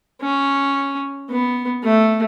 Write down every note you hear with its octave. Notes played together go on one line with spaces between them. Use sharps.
C#4
B3
A3